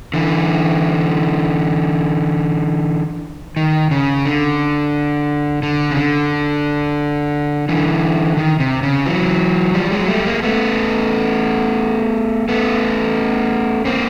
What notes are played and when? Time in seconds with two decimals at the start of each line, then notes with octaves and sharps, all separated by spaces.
0.14 D3 E3
3.56 D#3
3.91 C#3
4.26 D3
5.63 D3
5.91 C#3
5.97 D3
7.69 D3 E3
8.37 D#3
8.60 C3
8.83 C#3
9.06 E3 F#3
9.74 F3 G3
9.91 F#3 G#3
10.08 G3 A3
10.25 G#3 A#3
10.43 A3 B3
12.49 A3 B3
13.85 A#3 C4